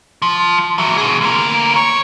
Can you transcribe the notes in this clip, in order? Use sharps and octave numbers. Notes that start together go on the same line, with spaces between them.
F3
E3 F#3
B2 G#4
D2 A#3
C#5